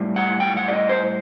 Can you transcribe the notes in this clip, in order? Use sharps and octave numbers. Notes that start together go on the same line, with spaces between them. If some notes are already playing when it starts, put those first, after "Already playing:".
Already playing: A2 G3
F#5
G5
F#5
D5
D#5
C5